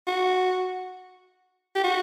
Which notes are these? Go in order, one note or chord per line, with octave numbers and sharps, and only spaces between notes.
F#4
G4
F#4